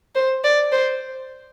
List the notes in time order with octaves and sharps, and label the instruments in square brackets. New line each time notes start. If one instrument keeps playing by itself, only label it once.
[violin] C5
D5
C5